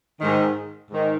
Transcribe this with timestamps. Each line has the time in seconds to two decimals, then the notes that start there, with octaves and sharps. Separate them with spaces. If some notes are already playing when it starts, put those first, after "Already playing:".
0.21 G#2 D#3
0.90 G#2 D#3